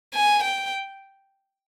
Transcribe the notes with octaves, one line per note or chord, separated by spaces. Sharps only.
G#5
G5